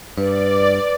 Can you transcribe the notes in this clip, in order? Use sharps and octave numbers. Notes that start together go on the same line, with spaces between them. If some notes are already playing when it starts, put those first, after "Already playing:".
G2 B4 D5